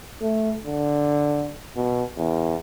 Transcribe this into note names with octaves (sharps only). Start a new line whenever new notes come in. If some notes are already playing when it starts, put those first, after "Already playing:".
A3
D3
B2
E2